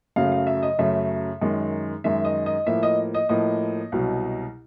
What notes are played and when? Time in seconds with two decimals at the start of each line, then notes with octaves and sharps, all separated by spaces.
0.16 F#2 C#3 F#3 A3 F5
0.32 F5
0.47 E5
0.63 D#5
0.79 F#2 C#3 F#3 A3 E5
1.42 F#2 D#3 G#3
2.04 F#2 D#3 G#3 E5
2.25 D#5
2.46 D#5
2.66 A2 F3 A#3 E5
2.83 D#5
3.14 D#5
3.29 A2 F3 A#3 D#5
3.92 C2 B2 F#3